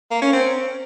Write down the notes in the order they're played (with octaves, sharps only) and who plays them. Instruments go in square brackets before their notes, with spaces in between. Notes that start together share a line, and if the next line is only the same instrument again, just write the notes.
[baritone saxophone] A#3
C#4
C4